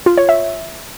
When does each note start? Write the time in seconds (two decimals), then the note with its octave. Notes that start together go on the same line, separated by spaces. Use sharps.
0.06 F4
0.18 C#5
0.29 E5